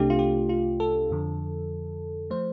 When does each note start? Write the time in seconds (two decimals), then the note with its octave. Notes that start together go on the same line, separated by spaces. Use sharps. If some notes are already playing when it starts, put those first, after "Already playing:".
Already playing: C2 C3 A3 D4 G4
0.10 F4
0.19 G4
0.49 F4
0.80 A4
1.10 F2 D3 F3
2.30 F3 A3 C5